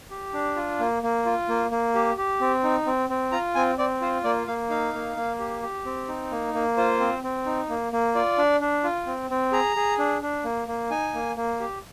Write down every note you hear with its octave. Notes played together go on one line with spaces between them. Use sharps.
G4
D4
F4
A#3
A#3
F4
A#3
A#3
G4
G4
C4
D#4
C4
C4
F4 A#5
C4 G#5
C4 D5
F4 C5
A#3 D5
A#3 F5
D#4 F5
A#3
A#3
G4
G4
C4
D#4
A#3
A#3
F4 C5
C4
C4
D#4
A#3
A#3
F4 D5
D4
D4
F4
C4
C4
G#4 A#5
G#4
D4
D4
A#3
A#3
D#4 G#5
A#3
A#3
G4